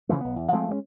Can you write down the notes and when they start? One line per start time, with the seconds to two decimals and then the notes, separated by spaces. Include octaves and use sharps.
0.09 C#3 E3 F3 A3
0.21 B1 B3
0.36 E2
0.52 F3 G#3 A3 C4
0.69 G#3 A#3 C#4